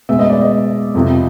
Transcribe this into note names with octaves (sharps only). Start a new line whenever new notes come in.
B2 G#3 E5
D#5
D5
D#5
F2 C3 F3